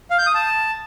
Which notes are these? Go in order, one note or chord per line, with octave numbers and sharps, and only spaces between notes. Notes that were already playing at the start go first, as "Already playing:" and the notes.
F5
G6
D#6
A5